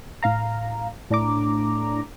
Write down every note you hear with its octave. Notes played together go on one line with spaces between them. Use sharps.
A2 F5 A#5
A2 D4 A#5 D6